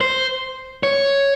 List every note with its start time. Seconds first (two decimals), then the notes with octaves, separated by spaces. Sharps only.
0.01 C5
0.83 C#5